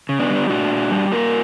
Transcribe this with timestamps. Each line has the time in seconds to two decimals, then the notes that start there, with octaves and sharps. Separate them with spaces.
0.09 C#3
0.19 B3 D4
0.30 G3
0.50 A#2 D4 F#4
0.70 A#2
0.91 G3
1.12 A#3 F#4 A#4